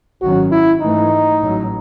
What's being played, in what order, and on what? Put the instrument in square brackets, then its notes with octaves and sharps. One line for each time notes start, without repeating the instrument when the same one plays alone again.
[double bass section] G#1 F#2 D#3 F#3 C#4 [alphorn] F#4
[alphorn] E4
[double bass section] G#2 E3 A3 [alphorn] D#4
[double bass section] A1 A2 F#3